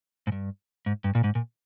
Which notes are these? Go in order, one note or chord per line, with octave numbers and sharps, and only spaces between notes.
G#2
G2
G#2
G2
A#2
G#2
A#2